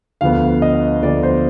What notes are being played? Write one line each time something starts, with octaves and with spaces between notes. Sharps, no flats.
D2 D3 F3 B3 F5
D#5
D2 D3 F3 B3 D5
C5